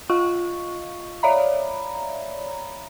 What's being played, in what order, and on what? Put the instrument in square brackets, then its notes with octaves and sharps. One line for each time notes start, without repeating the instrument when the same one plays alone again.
[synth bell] F4 D#5 F5 C#6
C#5 D5 E5 F5 A#5 B5